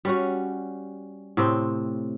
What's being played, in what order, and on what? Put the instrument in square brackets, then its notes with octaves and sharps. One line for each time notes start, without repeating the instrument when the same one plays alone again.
[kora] G3 C#4 F#4
A2 C3 C4